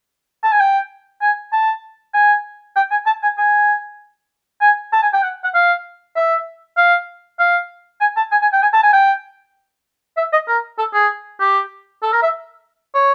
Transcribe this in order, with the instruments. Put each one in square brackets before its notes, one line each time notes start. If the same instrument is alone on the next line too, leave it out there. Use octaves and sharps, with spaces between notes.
[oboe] A5
G#5
G5
G#5
A5
G#5
G5
G#5
A5
G#5
G#5
G#5
A5
G#5
G5
F#5
F#5
F5
E5
F5
F5
G#5
A5
G#5
G#5
G5
G#5
A5
G#5
G5
E5
D#5
A#4
A4
G#4
G4
A4
A#4
E5
C#5